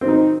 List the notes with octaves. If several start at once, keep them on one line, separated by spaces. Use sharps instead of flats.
D#3 C4 D#4